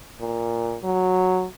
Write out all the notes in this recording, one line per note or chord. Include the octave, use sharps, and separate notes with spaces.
A#2
F#3